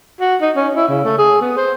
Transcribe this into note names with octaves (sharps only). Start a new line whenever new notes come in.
F#4
D#4
C#4
E4
C#3
A3
G#4
B3
C5